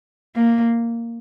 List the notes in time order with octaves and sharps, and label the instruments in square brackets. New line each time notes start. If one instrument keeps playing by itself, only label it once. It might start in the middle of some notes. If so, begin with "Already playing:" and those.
[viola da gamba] A#3